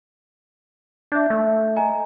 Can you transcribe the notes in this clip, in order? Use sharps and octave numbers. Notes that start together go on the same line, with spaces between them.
D4 E5 G6
A3
D#5 G#5 A#5